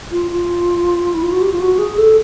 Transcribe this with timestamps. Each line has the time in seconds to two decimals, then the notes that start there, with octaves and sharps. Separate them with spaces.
0.12 F4
0.31 F4
1.14 E4
1.23 F4
1.32 F#4
1.41 G4
1.52 F4
1.60 F#4
1.79 G#4
1.97 A4